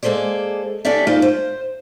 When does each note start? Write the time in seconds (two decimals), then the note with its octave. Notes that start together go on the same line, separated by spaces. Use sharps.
0.03 G#3 A#3 G#4 A4 C5 D5
0.85 C#4 D4 G4 A4 D5 E5
1.07 A#3 D#4 F4 C5 D5
1.22 C5